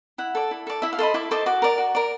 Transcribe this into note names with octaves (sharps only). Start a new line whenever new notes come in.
E4 F#5
A4 D5
E4
A4 D5
E4 E5
F5
A4 C5 D#5 B5
E4 D6
A4 C5 D#5 D6
F#4 D6
A#4 D5
F#4
A#4 D5